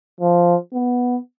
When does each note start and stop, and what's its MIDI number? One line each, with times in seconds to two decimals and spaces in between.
0.21 0.56 53
0.74 1.17 59